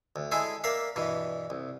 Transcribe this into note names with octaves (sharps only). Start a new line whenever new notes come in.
D2
G#3 E4 G#4 A4 G#5
A#3 A#4 D5 E5 F5
G2 B2 E3
C2